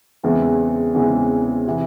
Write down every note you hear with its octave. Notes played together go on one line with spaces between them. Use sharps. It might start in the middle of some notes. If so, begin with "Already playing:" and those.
E2 C#3 E3 G#3 C4
E2 C#3 E3 G#3 C4
C3 E3